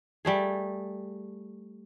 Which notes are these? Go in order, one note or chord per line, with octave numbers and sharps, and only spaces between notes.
G3 A3 G#4